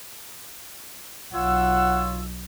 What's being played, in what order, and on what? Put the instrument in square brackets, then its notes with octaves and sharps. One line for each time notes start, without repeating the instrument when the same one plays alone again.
[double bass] B1 [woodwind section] F4 C#5 E6 [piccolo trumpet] F#5